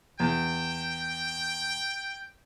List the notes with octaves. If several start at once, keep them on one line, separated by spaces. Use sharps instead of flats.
E2 G5